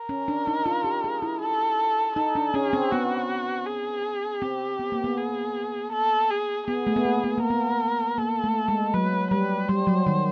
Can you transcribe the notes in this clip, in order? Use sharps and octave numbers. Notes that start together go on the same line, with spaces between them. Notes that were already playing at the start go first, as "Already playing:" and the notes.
Already playing: A#4
C#4
D4
D#4
F4
G4
G#4
E4
A4
D#4 A4
D4
C#4 G#4
C4
B3 F#4
G#4
C4 G4
B3
A#3
B3
G#4
A4
G#4
B3 G#4
A3
B3
A#3
B3
A#3
A#4
B3
A#3 A4
A3
G#3
F#3 B4
G3 B4
G3 C5
F#3
D#3